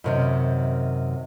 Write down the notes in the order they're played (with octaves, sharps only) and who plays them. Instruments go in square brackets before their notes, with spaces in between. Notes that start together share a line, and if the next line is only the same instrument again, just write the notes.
[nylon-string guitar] F#2 C3 D#3